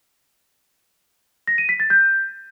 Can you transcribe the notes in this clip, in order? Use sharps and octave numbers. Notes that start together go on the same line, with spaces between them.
A#6
D#7
B6
A6
G6